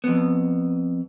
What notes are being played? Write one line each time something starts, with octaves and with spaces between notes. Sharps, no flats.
F2 B3